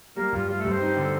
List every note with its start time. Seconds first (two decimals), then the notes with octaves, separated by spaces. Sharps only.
0.16 G3 A#3 A#4
0.33 G2 F4
0.48 G3 F4
0.59 A3 A4
0.65 G2
0.70 C4 C5
0.81 D#4
0.87 G4
0.97 D3 A4